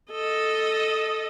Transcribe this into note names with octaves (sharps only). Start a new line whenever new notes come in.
A4 D#5